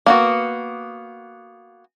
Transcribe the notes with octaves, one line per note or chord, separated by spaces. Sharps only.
A#3 B3 F#4